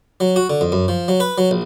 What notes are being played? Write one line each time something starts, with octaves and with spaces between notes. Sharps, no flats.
F#3
F#4
D3
F2
F#2
F3
F#3
B4
F#3
A#1